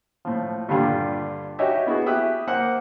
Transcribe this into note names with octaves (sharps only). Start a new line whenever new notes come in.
A2 F3
G2 A#2 D3 G3 F4
D#4 F#4 G4 C#5 D#5 E5
B3 E4 F#4 G#4
G4 E5 D#6 F#6
A#3 C5 F#5